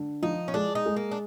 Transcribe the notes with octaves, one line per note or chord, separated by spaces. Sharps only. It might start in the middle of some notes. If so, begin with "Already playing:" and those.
Already playing: D3
F3 D#4
C#4
G#3 D4
D#4
G#3
A#3
D4